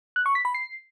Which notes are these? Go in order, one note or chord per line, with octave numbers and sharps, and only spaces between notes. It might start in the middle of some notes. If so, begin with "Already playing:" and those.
F#6
C#6
B6
B5
C7